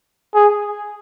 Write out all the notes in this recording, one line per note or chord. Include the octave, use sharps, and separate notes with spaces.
G#4